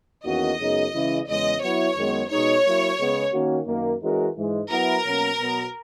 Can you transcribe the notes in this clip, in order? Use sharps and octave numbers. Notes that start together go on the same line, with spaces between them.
E2 D#3 A#3 C#4 F#4 D#5
F#2 C#3 G#3 B3 D#4
C#3 E3 G#3 C#4 E4
E2 C#3 G#3 D#5
F#3 B3 E4 C#5
F#2 D#3 G#3 B3
B2 G#3 D#4 C#5
F#3 A#3 E4
C#3 G#3 B3
D#3 A#3 C#4 F#4
F#2 D#3 A#3
E3 G#3 C#4 F#4 A#4
G#2 E3 G#3
F#3 B3 E4 A#4
B2 F#3 A#3 C#4
B2 F#3 B3